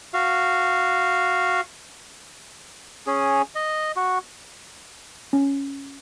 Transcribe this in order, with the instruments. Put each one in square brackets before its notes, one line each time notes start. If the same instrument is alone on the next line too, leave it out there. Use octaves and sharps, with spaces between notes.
[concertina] F#4 F5
[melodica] C#4 G#4
D#5
F#4
[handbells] C#4